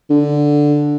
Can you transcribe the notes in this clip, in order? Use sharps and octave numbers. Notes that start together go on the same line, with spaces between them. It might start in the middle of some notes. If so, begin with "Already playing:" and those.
D3